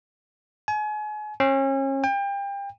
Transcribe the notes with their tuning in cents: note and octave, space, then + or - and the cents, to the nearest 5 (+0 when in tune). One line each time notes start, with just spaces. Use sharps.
G#5 +35
C#4 -35
G5 +30